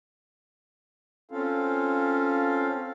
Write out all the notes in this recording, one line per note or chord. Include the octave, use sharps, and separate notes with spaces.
C4 C#4 F4 A4 F5